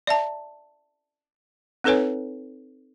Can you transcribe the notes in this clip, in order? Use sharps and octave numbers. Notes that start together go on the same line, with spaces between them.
D5 E5 A5 A#5
C4 D#4 A4 B4 C#5 G#5